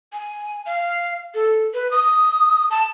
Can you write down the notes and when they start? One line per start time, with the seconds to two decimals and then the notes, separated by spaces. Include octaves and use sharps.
0.13 G#5
0.66 F5
1.35 A4
1.74 B4
1.91 D#6
2.71 A5